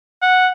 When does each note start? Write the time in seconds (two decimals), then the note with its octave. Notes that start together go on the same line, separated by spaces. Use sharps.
0.22 F#5